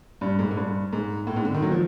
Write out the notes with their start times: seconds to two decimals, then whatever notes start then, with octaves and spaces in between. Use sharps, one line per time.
0.21 G2
0.39 G#2
0.51 G#2
0.57 G2
0.93 G#2
1.27 A2
1.36 G#2
1.45 D3
1.55 D#3
1.62 F#3
1.71 F3